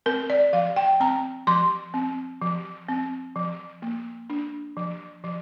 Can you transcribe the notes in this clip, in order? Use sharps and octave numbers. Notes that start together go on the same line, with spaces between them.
C4 A#4
D5
F3 F5
G5
C4 A#5
F3 C6
C4
F3
C4
F3
A#3
D4
F3
F3